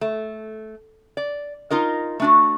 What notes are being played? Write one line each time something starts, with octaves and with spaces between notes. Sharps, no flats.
A3
D5
D#4 F4 A#4 D#5
A3 D4 F#4